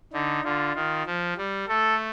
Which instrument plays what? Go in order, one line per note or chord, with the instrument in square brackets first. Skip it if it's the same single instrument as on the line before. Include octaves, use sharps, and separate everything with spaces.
[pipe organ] D3 [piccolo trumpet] D#4
[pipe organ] D3 [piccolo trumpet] F4
[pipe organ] D#3 [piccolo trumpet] F4
[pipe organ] F3
G3
[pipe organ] A3 [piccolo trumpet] A4